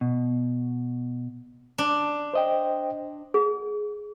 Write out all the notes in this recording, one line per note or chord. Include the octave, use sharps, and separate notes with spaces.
B2
D4
C5 D#5 G5
G#4